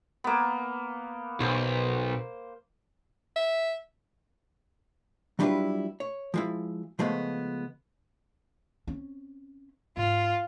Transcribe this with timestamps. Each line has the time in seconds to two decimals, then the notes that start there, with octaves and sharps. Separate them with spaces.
0.24 A#3 B3
1.41 B1 C5
3.35 E5
5.39 F#3 G3 D4 E4 F4 B4
6.00 C#5
6.34 F3 G#3 E4
6.99 C#3 F3 G#3 A3 B3
8.87 C4 C#4
9.97 G#2 F4